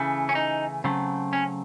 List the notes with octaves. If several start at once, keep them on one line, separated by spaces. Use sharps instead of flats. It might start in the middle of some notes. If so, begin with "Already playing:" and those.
Already playing: C#3 E3 A3
C#4
D#4
C#3 F#3 A3 C4
C#4